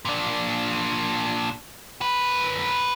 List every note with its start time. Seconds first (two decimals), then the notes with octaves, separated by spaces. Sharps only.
0.05 A#2 D4
2.02 F#2 B4